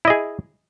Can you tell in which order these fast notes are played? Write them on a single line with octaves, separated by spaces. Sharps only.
E4 D#5 G#4